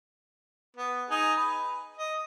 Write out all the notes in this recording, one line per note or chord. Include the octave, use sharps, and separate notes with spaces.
B3
D#4 G#4
B4
D#5